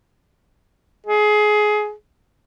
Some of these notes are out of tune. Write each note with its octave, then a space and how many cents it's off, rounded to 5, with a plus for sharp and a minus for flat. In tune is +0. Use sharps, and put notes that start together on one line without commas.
G#4 +20